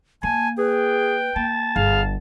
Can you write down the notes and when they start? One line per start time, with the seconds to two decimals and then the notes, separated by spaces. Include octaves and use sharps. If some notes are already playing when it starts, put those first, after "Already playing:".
0.23 A#3 G#5 A5
0.58 G#4 B4 G5
1.36 A#3 A5
1.76 G1 G#4 F5